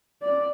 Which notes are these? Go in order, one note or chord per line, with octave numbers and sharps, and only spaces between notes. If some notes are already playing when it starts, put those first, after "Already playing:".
D5